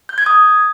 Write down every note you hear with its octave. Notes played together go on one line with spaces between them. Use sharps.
G6
G#6
D#6